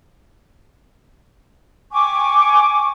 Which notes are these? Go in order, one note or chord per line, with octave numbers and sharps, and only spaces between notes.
G5 G#5 C#6 D6